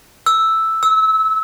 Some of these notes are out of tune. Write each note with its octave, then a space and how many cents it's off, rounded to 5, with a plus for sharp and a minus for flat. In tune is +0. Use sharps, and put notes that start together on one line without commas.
E6 +0
E6 -25